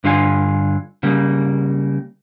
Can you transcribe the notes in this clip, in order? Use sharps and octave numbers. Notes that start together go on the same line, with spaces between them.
G2 D3 F4 F5 G#5
C#3 G3 A#3